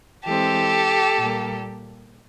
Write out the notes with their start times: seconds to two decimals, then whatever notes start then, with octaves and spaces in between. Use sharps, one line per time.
0.25 E3 G#3 C4 G4 A4
1.18 A#2 G3 A#3